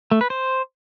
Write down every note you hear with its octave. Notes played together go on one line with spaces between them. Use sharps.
A3
B4
C5